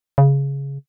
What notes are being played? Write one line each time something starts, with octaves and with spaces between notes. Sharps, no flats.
C#3